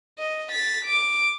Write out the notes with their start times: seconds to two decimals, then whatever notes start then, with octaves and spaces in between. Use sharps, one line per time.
0.18 D#5
0.50 A6 B6
0.85 D6